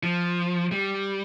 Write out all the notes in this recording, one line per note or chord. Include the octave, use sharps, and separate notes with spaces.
F3
G3